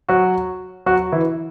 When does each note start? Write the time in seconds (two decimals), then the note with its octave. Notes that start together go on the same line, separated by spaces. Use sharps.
0.09 F#3 F#4
0.86 F#3 F#4
1.12 E3 E4